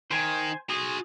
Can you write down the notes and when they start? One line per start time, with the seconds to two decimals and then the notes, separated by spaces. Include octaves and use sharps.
0.11 D#3 C5 G#5
0.70 F#4 G#4 C6